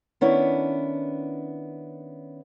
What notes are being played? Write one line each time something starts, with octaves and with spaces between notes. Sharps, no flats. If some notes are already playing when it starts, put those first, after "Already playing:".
D#3 B3 C#4 D4 E4